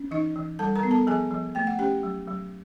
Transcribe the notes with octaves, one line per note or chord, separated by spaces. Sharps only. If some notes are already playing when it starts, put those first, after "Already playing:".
Already playing: C#4
E3 D#4 D#5
E3
G3 A4 A5
A#4 A#5
B3
A4 A5
F3 G#4 G#5
F3
A3 G5
F#5
C#4 G4 G5
F#3
F#3